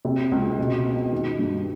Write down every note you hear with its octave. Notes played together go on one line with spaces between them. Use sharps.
C3
C#2
B2
B3
D#3
G2